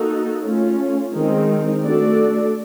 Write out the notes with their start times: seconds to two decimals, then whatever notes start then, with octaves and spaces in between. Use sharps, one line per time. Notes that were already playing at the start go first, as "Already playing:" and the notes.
Already playing: A#3 D#4 F#4 A4
0.42 A3 C#4 F4
1.13 D#3 G#3 C4 D#4
1.82 A3 D4 F#4 A4 D5